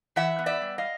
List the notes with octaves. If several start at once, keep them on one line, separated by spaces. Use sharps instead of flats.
E3 E5 F#5
B3
D5 E5
G3
D#5 F5